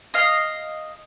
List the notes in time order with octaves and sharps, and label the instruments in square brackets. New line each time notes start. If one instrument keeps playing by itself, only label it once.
[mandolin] D#5 F5